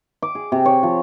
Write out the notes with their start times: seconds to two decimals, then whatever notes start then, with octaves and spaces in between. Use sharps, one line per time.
0.22 D6
0.35 G#4
0.52 C3
0.65 C#5
0.83 F3